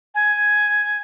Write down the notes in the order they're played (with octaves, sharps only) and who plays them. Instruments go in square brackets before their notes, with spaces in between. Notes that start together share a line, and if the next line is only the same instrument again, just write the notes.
[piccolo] G#5